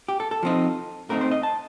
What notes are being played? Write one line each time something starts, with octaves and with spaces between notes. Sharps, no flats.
G4
A4
A4
F3 C4 D#4
A2 A3 C4 D#4 A#4
C5
D#5
A5